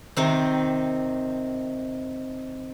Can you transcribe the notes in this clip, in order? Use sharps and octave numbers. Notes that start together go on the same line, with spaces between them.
C3 D#3 C4